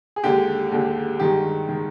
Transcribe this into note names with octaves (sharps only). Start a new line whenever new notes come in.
G#4
D#2 D3 G#3 G4
D#2 D3 G#3
G2 D#3 G#3 G4
D#3 G#3